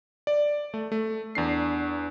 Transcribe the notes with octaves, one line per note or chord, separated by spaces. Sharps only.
D5
A3
A3
E2 D4 C7